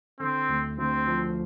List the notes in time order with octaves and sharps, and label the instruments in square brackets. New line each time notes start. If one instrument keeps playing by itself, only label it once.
[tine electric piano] D3 [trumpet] C4
[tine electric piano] D2
[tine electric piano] D2 [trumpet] C4
[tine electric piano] F3